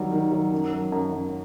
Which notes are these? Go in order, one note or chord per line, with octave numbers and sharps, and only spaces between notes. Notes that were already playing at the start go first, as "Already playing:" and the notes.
Already playing: D#3 F#3 G3
D#3
F#3
F#2
F#2
F#2
F#2